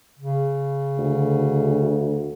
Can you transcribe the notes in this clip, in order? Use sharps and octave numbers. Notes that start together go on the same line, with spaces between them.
C#3
D2